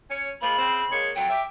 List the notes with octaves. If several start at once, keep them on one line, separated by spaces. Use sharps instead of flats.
C#4 C#5
F3 G#3 A#3 B5
C#3 C4
G#3 A#3 C#5
F2 F#3 G5
G4 E5